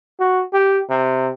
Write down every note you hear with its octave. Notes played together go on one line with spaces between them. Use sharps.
F#4
G4
C3